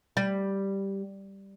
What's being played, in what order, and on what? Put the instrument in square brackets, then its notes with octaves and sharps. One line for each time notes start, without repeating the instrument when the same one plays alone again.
[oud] G3